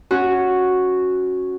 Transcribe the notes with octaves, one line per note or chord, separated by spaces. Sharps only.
C#4 F#4